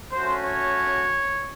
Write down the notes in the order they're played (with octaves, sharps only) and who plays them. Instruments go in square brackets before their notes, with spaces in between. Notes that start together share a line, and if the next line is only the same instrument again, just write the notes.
[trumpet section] A3 C#4 F#4 C5
C#5